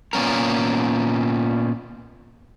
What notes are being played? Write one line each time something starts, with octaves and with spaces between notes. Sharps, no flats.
A#2 B3 C#4 A#4